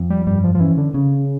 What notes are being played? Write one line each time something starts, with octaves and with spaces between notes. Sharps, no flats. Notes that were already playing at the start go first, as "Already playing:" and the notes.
Already playing: F2
G3
G2 G3
F3
F3
E3 C#4
D3
C#3 C#4